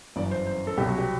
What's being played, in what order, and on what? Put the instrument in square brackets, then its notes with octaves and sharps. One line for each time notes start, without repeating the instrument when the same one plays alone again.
[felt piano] G1 F#2 E3 D5
C5
C5
A4
C2 B2 F#3 G4
F#4
G4